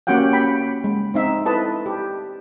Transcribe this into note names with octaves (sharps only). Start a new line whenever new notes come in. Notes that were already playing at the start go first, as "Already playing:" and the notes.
A#3 C#4 F#4 G4 F#5 G5
G5 B5
G#3
C4 D#4 E5
E4 A4 B4 D#5 A5
G4